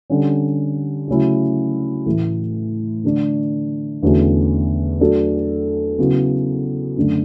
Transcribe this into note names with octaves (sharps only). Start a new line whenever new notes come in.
D3 G3 C#4
C#3 F#3 A3 C#4 E4
A2 E3 A3
D3 A3 D4
E2 D3 A3 C#4 F#4
F#3 A3 D4 F#4 A4
C#3 F#3 B3 E4
F#2 D3 A3 D4